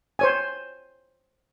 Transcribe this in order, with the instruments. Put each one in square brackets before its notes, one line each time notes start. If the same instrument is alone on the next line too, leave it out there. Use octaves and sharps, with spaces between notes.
[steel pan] C5 C#5 G#5